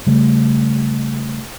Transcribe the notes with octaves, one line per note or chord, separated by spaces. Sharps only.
C#3 G3 A3